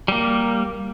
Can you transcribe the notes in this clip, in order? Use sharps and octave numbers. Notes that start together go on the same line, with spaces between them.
G3 A#3